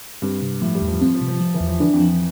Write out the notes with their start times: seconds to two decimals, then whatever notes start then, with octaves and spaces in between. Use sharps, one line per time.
0.22 G2 C4
0.42 C3
0.62 A2 F3
0.75 G3
0.82 E2
0.88 F3
1.01 F3 C4
1.14 F3
1.21 C3
1.28 F3
1.41 F3
1.54 E3
1.60 E2
1.68 F3
1.80 E3 D4
1.93 F2
2.00 F3